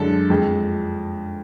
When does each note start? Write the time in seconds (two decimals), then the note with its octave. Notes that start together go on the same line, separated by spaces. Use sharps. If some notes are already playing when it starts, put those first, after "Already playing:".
Already playing: F#2 D3 G#3 A4
0.30 F2 F3 G#3